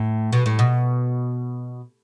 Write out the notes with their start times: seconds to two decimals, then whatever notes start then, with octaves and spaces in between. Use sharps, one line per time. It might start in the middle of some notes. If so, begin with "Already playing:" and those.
Already playing: A2
0.33 B2
0.46 A2
0.59 B2